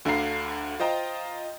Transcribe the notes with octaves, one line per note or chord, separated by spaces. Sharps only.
D2 D3 D4 F5 A#5 C7
F4 C5 D#5 G5 A#5